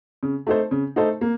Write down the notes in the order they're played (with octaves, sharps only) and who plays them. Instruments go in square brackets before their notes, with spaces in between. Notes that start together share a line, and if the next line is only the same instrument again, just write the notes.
[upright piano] C#3
A3 D#4 A4 C5
C#3
A3 D#4 A4 C5
A#3